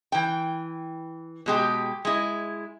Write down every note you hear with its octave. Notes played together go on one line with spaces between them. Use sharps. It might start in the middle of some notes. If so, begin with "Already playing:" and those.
E3 G5
B2 G#3 G4
G#3 E4